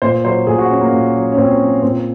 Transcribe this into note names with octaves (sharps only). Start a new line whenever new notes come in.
A#2 C5
F#3 C5
A#2 G#4
F#4
F#3 C#4
A#3
A#2
F#3
C#4
A#2 C4
F#3
A#2 C4